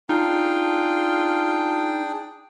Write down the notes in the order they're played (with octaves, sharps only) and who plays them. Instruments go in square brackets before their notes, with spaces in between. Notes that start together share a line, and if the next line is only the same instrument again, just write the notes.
[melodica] D4 G#4 G5 [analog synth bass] D#4 [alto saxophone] F4